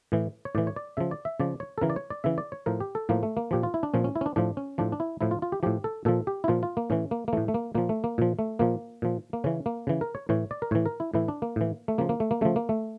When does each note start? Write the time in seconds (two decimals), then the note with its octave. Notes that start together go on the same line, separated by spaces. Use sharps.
0.12 A2 E3
0.45 C#5
0.55 A2 E3 D5
0.67 C#5
0.76 D5
0.97 C#3 F3 E5
1.11 D5
1.25 E5
1.40 C#3 F3 D5
1.60 C#5
1.78 A4
1.81 C#3 E3 A#4
1.90 D5
1.96 C#5
2.10 D5
2.24 C#3 E3 E5
2.38 D5
2.52 C#5
2.66 A2 F3 A#4
2.80 G4
2.95 A4
3.09 A2 F3 A#3
3.23 A3
3.37 A#3
3.51 A#2 F3 G4
3.63 F4
3.74 E4
3.83 D4
3.94 A#2 F3 C#4
4.04 C#4
4.16 E4
4.21 C#4
4.26 D4
4.36 A2 F3 D4
4.57 C#4
4.78 A2 F3 D4
4.92 D4
5.00 E4
5.21 A2 F3 E4
5.31 F4
5.42 F4
5.52 G4
5.63 A2 F3 G4
5.84 A4
6.05 A#2 F3 A4
6.27 G4
6.44 E4
6.48 A#2 F3 F4
6.63 F4
6.77 A#3
6.90 A2 E3 C#4
7.11 A#3
7.28 A#3
7.33 A2 E3 A3
7.48 A3
7.54 A#3
7.75 A#2 F3 A#3
7.89 A3
8.04 A#3
8.18 A#2 F3
8.39 A3
8.59 A#2 F3 A#3
9.02 A#2 F3
9.33 A#3
9.44 C#3 E3 C#4
9.66 A#3
9.87 C#3 E3
10.01 A#4
10.15 C#5
10.29 A2 E3 C#5
10.51 D5
10.62 A#4
10.71 A2 E3 C#5
10.86 A#4
11.00 E4
11.14 A2 E3 E4
11.28 D4
11.42 A#3
11.56 A2 E3
11.88 A3
11.98 C#3 F3 A#3
12.09 A#3
12.20 A3
12.31 A#3
12.41 C#3 F3 A3
12.56 A#3
12.69 A3